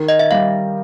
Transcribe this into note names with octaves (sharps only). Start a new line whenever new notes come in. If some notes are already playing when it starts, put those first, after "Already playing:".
Already playing: D#3
D#5
E5
G3 F5